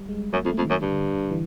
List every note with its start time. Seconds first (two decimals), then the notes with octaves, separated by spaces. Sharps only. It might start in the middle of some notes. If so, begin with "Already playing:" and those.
Already playing: G3
0.09 G#3
0.33 F#2 A#3
0.45 F2
0.50 A3
0.58 F2
0.65 F#2 D#3
0.82 G2 D3
1.31 E3